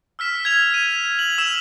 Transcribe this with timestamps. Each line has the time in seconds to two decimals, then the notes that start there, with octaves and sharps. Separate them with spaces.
0.19 E6 F6 B6 E7
0.45 G#6 F7
0.71 G#6 D#7
1.19 F#7
1.38 E6 E7 F#7